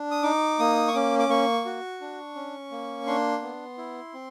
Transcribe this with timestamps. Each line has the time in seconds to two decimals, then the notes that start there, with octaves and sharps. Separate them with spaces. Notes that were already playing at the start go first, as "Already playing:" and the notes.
Already playing: D4
0.11 D#6
0.23 D#4 D6
0.59 A#3 D#6
0.88 C#6
0.94 C#4 D6
1.19 D6
1.29 A#3 C#6
1.65 F#4
2.01 D4
2.36 C#4
2.71 A#3
3.07 D4 C6
3.42 B3
3.78 E4
4.14 C4